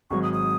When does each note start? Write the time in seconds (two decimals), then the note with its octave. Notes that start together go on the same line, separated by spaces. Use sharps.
0.10 G#1 G#2 F#3 C#6
0.23 D#6
0.33 D#6